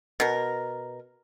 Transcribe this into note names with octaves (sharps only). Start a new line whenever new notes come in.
B2 A#4